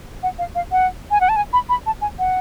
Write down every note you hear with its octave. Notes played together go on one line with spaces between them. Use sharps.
F#5
F5
F5
F#5
G#5
F#5
A5
G#5
B5
B5
A5
G#5
F#5